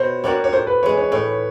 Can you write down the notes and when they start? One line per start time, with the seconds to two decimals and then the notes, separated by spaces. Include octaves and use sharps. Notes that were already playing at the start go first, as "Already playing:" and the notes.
Already playing: B2 C5 C#5
0.24 G3 A#3 D4 F#4 C#5
0.44 C#5
0.52 A2 C5
0.67 B4
0.83 E3 G#3 C#5
0.97 C#5
1.12 A2 C#5